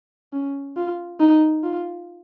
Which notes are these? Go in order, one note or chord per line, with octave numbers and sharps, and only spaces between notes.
C#4
F4
D#4
F4